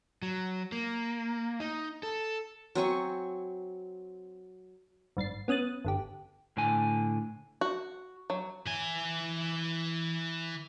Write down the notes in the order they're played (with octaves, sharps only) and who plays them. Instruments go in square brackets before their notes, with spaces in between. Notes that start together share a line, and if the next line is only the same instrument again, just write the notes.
[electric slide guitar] F#3
A#3
D#4
A4
[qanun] F#3 C4 G#5 C#6
[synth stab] G#1 G2 A6 C7
B3 C#4 D#6 F#6 A6
G1 D3 G4
[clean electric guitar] A2 D3 G#5
[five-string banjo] F#4
F#3
[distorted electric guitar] E3 G#5